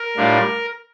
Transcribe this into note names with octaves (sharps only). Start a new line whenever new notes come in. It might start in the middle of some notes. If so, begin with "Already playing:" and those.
Already playing: A#4
A2 G3 D4 F4